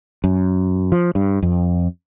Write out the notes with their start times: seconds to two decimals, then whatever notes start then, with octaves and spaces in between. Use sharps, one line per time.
0.24 F#2
0.92 F3
1.15 G2
1.43 F2